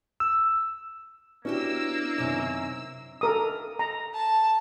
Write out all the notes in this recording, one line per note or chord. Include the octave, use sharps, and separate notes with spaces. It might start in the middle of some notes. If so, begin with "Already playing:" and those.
E6
A#3 B3 C#4 D4 E4 F#4 G4 E6
F#2 C3 D#3
A4 A#4 D#6
A#5
A5